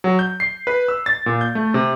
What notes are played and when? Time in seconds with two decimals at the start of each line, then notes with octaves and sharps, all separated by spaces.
0.04 F#3
0.19 G6
0.40 C7
0.67 B4
0.88 E6
1.06 A6
1.26 A#2
1.41 G6
1.55 A3
1.74 C3